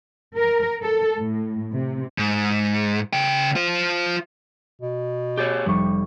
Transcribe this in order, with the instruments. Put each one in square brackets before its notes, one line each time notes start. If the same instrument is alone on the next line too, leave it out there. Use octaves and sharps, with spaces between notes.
[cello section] A#4
A4
A2
C3
[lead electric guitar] G#2
C#3 G5
F4 C5
[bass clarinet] B2
[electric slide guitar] G4 G#4 C#5 [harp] G6 A6
[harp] F1 C#6 [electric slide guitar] G3